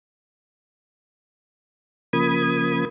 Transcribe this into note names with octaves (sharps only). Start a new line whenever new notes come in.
C#3 F3 A#3 B5 D#6 G#6